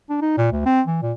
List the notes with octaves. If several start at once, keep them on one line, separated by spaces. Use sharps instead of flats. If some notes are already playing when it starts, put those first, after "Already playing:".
D4
D#4
A#2
D2
C4
E3
A#2